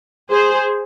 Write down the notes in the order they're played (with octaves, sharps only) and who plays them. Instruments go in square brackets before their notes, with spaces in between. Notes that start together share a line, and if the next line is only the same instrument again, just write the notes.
[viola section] G#4 C5